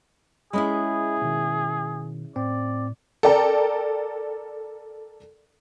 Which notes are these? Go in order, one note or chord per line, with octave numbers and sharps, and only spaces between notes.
G#3 C#4 E4 G#4 D#5 B5 D#6
B2 D#3
A2 C4 D5
A4 A#4 D5 G5 A#5